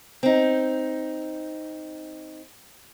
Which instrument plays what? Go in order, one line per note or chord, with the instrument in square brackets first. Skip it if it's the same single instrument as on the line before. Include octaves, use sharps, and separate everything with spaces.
[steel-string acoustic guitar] C4 D#4